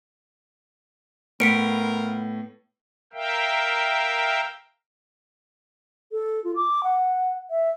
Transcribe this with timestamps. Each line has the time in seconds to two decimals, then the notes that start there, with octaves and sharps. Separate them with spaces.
1.40 A2 B3 F4 A#4 B6 C#7 D7
3.13 A#4 E5 F5 G5
6.11 A4
6.44 F4
6.56 D6
6.84 F#5
7.50 E5